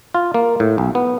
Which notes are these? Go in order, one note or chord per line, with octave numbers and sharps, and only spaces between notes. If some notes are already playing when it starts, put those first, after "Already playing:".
F4
A#3
A2
B1
B3